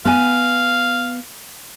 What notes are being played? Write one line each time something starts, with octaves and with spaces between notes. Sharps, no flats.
B3 F5 G#5